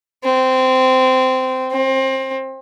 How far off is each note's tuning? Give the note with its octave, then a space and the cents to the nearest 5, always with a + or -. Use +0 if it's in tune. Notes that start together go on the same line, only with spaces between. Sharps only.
C4 -15
C4 +25